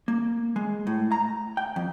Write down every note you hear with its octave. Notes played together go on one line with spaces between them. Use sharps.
A#3
G#3
A2
A#5
G5
F2